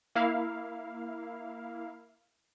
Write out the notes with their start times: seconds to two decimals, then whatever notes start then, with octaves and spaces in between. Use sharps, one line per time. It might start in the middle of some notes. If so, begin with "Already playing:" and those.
0.15 A#3 E4 F5